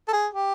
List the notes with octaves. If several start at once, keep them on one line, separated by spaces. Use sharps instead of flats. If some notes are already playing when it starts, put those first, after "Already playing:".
A4
G#4
G4